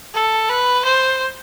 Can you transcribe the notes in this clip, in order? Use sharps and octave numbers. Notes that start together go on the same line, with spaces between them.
A4
B4
C5